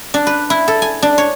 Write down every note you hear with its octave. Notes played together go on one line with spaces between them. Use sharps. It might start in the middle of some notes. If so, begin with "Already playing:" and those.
D4
B4
E4
A4
G#5
D4
C#5